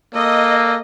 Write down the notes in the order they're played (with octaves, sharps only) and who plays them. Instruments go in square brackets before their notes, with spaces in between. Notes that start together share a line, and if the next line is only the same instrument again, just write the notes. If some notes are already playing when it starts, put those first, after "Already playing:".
[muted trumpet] A#3 [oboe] A4 [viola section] D#5